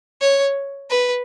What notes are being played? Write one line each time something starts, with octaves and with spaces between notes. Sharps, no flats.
C#5
B4